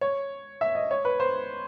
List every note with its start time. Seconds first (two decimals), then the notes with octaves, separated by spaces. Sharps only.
0.01 C#5
0.61 E5
0.75 D#5
0.91 C#5
1.05 B4
1.20 C5